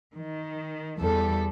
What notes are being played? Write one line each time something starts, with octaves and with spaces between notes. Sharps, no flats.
D#3
E2 G3 A4